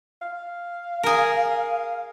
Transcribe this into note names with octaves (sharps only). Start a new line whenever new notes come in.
F5
G#4 A#4